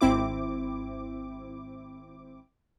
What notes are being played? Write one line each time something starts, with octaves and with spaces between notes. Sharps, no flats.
G#1 C4 E4 D6